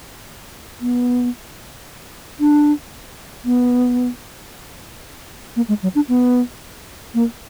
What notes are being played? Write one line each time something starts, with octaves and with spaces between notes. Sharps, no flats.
B3
D4
B3
A#3
G#3
F#3
D4
B3
A#3